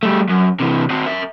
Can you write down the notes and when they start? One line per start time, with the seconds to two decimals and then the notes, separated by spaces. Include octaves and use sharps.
0.03 G3 A3
0.29 F#2
0.60 C3 E3
0.90 C4 F#4
1.06 A#4 E5